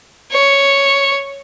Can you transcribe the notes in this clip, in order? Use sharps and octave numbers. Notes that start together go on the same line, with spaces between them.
C#5